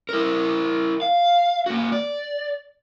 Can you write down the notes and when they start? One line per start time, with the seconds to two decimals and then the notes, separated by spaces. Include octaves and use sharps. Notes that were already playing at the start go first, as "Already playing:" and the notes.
0.09 E4 A#4
1.02 F5
1.66 A#3 F#4
1.92 D5